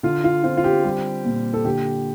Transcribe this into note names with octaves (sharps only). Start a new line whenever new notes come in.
D3 F4
F4
C4 F4
F4
G4
G3
A#2
A4
D3 G4